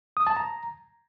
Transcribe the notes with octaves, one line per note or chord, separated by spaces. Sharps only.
D#6
A5
A#5